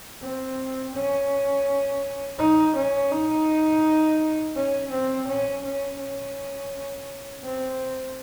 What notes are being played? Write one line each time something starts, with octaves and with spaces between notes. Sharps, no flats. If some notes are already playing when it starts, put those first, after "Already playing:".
C4
C#4
D#4
C#4
D#4
C#4
C4
C#4
C#4
C#4
C4